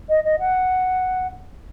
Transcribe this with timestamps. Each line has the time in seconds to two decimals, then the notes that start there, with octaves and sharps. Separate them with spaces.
0.09 D#5
0.25 D#5
0.40 F#5